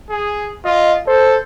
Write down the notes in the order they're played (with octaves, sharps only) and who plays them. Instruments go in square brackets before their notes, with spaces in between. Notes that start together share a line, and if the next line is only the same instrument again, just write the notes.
[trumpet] G#4
[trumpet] F4 [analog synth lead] D#5
[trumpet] A4 [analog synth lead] C5